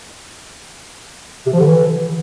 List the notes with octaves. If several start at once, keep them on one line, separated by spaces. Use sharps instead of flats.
C3
F3
D3
E3